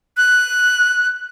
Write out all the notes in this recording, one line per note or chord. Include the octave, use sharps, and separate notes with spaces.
F#6